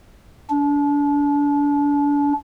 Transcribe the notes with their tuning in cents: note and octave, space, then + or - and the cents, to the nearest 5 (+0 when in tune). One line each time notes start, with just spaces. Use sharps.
D4 -30